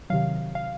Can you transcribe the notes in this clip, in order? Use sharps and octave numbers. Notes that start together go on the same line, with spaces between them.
C3 D#3 F#3 F5
F5